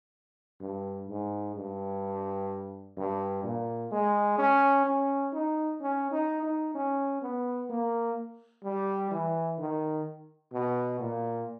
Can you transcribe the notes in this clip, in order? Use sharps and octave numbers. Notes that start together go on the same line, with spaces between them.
G2
G#2
G2
G2
A#2
G#3
C#4
C#4
D#4
C#4
D#4
D#4
C#4
B3
A#3
G3
E3
D#3
B2
A#2